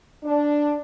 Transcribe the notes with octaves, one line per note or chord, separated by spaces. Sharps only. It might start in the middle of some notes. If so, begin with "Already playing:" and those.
D4